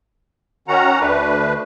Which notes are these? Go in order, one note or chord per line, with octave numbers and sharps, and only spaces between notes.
D#3 C#4 F#4 F#5 A#5
D2 A3 D4 B4